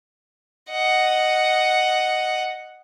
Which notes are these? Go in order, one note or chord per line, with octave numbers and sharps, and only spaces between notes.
D#5 F#5